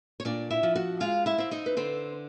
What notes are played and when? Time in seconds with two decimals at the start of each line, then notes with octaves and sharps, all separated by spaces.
0.20 C#5
0.25 A#2 D4 D5
0.50 E4 E5
0.63 F3
0.75 F#4 F#5
1.00 G#3 F4 F5
1.26 E4 E5
1.38 C4 E5
1.51 D#4 D#5
1.66 B4
1.77 D3 C4 C5